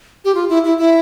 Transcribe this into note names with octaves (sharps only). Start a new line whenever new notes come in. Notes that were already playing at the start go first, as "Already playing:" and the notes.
G4
F4
E4
E4
E4